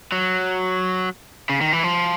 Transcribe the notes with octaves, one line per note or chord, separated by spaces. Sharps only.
F#3
C#3
D#3
E3
F3